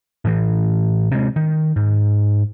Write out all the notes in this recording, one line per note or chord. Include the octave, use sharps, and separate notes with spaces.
A2 E3
C3 G#3
D#3
G#2